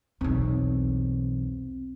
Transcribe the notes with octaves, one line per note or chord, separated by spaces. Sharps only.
B1 E2 C4